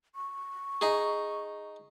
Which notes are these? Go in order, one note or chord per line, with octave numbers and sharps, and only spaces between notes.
C#6
D#4 G#4